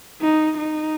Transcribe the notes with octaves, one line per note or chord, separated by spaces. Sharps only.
D#4
D#4